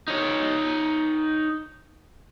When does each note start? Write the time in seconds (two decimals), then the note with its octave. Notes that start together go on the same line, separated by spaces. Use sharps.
0.08 D#4 C#5